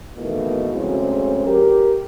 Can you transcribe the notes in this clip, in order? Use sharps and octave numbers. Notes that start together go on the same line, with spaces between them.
G#2 B2 D#3 E3 A3 A#3
D2 C#3 F#3 G#3 C4 C#4
G4 A#4